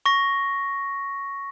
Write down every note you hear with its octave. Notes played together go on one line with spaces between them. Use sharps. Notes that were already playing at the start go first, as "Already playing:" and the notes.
C#6 A#6